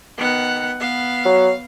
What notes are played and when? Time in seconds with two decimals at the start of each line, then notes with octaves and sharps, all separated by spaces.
0.18 D#3 B3 F#5
0.80 B3 F5
1.25 F#3